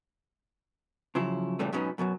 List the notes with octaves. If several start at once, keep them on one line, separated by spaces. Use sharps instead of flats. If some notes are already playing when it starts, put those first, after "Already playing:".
C#3 F3 F#3 E4
A#2 C#3 E3 G3 A3 C#4
G#2 B2 F#3 B3 C#4 D#4
F#2 B2 F3 F#3